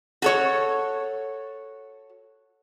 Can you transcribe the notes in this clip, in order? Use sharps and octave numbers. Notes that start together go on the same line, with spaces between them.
F#4 A4 C#5